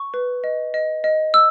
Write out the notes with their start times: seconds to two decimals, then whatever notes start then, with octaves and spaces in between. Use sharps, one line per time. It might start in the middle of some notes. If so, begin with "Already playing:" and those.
Already playing: C#6
0.14 B4
0.44 D#5
0.74 D#5
1.04 D#5
1.34 E6